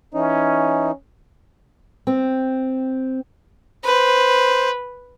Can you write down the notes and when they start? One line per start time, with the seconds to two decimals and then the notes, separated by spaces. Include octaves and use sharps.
0.14 E3 C#4 D#4
2.07 C4
3.85 B4 C5